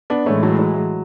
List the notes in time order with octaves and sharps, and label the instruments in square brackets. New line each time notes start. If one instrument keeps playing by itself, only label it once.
[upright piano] B3 D4
[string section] A2 E3 G#3 [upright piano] A3 C#4
[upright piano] F#3 A3
F#3